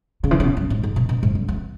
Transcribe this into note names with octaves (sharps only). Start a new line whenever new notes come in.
C#3
E3
C#3
B2
F#2
G#2
G#2
B2
B2
G#2
F#2
E2